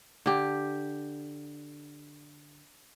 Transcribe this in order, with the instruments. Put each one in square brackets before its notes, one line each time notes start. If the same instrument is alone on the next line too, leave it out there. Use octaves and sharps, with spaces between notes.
[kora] D3 G4